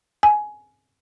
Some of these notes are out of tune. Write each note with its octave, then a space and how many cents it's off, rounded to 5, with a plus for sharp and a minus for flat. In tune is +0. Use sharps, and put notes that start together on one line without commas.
G#5 +15